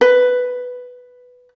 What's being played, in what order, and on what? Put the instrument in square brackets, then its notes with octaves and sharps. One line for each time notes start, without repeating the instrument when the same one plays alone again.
[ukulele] B4